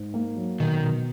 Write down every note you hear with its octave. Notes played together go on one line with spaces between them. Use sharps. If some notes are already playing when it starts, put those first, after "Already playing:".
Already playing: G#2
A#3
F#3
B2 D#3
B2